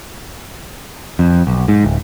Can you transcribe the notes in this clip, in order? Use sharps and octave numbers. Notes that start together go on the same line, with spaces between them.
F2
B1
G#2
D1